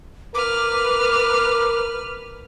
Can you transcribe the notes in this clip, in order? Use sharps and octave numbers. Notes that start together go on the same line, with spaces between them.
A#4 B4 D6 F6